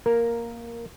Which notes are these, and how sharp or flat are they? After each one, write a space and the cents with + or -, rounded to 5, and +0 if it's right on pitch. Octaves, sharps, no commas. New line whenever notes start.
A#3 +0 A#4 +0